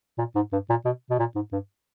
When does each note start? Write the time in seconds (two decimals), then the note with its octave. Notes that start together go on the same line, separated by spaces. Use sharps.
0.18 A#2
0.35 G#2
0.53 G2
0.70 A#2
0.85 B2
1.10 B2
1.19 A#2
1.35 G#2
1.53 G2